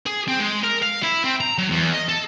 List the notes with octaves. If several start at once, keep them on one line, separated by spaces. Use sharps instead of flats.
G#4
C4
G#3
A#4
F5
E4
C4
A#5
F#3
E2
D#5
A4